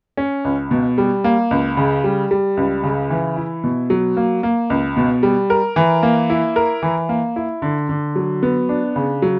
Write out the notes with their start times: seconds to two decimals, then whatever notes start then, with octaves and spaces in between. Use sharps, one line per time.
0.17 C#4
0.45 C#2
0.71 B2
0.98 G3
1.24 A#3
1.51 C#2
1.77 C#3
2.04 G3
2.31 G3
2.57 C#2
2.84 C#3
3.10 E3
3.36 E4
3.64 B2
3.90 F#3
4.17 A#3
4.43 A#3
4.70 C#2
4.97 B2
5.23 G3
5.50 A#4
5.76 E3
6.03 A#3
6.30 E4
6.56 A#4
6.83 E3
7.09 A#3
7.36 E4
7.62 D3
7.89 D3
8.16 F#3
8.43 B3
8.69 D4
8.96 C#3
9.22 F#3